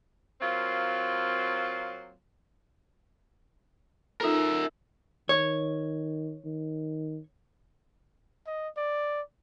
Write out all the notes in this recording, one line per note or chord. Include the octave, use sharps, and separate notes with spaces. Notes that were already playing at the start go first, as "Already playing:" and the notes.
F#3 A#3 C4 F4
D#4 F4 A4 A#4 E5
D#3 C#5
D#3
D#5
D5